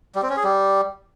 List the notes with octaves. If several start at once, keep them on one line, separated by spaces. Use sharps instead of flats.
G3
C4
C#4
G#4
G3